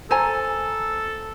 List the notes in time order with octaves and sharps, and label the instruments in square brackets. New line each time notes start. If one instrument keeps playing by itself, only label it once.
[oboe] A4 [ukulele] C5 G#5 A#5